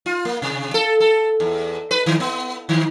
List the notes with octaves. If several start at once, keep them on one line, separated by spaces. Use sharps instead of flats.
F4
A#3
C3
A4
A4
E2
B4
D#3
B3
D#3